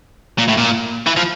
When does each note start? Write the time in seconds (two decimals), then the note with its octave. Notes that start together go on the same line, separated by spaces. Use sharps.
0.38 A#2
0.48 A2
0.57 A#2
1.07 E3
1.17 F3